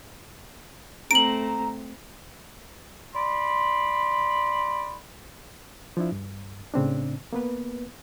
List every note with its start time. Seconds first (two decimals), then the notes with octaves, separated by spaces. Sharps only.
1.11 A3 C4 A#5 D7 F#7
3.15 D5 B5 C6
5.97 F3 D4 E4
6.12 G2
6.74 A2 C#3 C4 D4
7.33 A#3 B3 B4